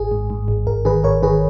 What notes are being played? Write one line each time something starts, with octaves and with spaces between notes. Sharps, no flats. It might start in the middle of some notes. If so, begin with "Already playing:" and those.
Already playing: G#1 G#4
G#2
G#2
G#1
G#1 A#4
D#3 G#4 B4
G#1 A#4 C#5
D#3 G#4 B4